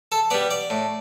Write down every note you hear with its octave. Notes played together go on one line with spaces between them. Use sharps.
A4
G3 B3 D5
D5
A2